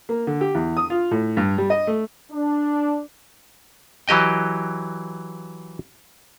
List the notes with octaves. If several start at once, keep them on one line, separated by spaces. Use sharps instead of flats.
A#3
D3
G4
E2
D#6
F4
A2
G2
G3
D#5
A3
D4
E3 F#3 G4 D#5 G5